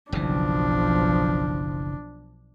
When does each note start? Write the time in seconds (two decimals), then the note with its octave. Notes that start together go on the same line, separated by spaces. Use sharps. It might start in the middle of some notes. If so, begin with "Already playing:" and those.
0.12 F#1 B1 C#3 E3 F3 D4